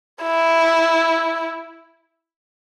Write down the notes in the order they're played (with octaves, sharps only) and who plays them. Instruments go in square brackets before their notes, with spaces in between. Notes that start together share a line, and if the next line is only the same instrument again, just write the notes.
[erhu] E4